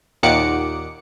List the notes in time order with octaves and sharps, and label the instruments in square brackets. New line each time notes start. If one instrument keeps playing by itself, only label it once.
[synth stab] D#2 A#2 D#3 F#5 D6 C#7